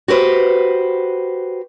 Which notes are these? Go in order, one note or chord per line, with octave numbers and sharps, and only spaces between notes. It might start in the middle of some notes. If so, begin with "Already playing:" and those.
F#4 G4 B4 C5